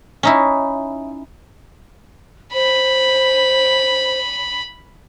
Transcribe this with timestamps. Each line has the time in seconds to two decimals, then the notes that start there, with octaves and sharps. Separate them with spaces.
0.23 C#4 D#4 E4
2.54 C5 B5